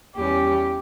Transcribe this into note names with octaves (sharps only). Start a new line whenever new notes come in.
E2 E3 G3 C#4 G4